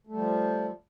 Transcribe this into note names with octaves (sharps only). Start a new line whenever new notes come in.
F3 G3 A3